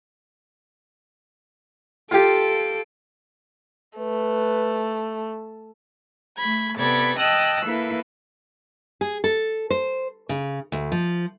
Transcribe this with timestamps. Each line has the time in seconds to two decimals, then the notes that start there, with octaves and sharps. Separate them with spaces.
2.11 F4 G4 A4 D7
3.98 A3 B4
6.36 A3 B5 G#6
6.76 C3 B3 A4 D5 B5 G#6
7.17 D#5 G5 A5 D#6 E6 F#6
7.65 A#3 E4 A4 B4
9.01 G#4
9.24 A4
9.70 C5
10.29 C#3
10.72 D2
10.92 F3